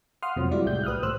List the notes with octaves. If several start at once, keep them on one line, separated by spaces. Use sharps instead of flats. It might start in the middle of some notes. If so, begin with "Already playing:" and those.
F5 F#5 C6 D#6 F6
F2 C3 F3 F#3
G3 G#3 E4 F#4 D5
C2 A2 G4 G6
B4 D#6 F6 F#6
A2 E3 C5 E6 F#6